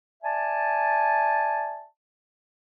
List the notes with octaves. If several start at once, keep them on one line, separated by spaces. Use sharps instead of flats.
D5 E5 G#5 A5